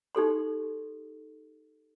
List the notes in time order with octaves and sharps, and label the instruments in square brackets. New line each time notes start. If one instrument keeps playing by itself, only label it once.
[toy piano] D#4 G4 A4 C6